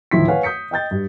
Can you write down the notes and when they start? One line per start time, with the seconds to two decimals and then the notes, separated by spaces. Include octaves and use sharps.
0.11 D1 D#3 F3 E4 C6 B6
0.28 B4 C#5 F5 F#5 G#5
0.43 D#6 G6 B6 C#7
0.71 D#5 G5 G6 A6
0.91 G2